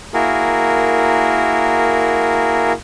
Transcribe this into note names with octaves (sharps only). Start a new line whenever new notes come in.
A#3 E4 F#4 G#4 A#4